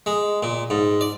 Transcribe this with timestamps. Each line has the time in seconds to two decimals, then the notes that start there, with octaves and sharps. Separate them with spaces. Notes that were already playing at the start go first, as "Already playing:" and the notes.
0.06 G#3
0.43 A#2
0.70 G#2
1.01 D5